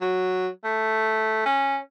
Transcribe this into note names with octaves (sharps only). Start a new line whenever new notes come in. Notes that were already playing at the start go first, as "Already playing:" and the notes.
F#3
A3
C#4